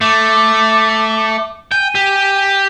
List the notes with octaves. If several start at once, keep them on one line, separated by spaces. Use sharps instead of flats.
A3 D6
G5 G#5
G4